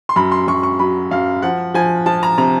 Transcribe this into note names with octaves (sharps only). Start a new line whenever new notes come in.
C6
F#2 B5
C6
F#2 C#6
C#6
F#3 B5
F#2 F5
F3 F#5
F3 G#5
F3 A5
A#5
C3 A#5